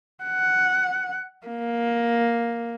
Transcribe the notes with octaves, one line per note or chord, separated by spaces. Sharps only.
F#5
A#3